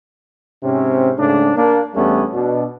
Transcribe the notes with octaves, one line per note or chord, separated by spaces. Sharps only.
G#2 C3 C4 C#4
G#2 C#3 A3 D4
A#3 D4
E2 G3 A3 B3 C#4 D4
B2 D4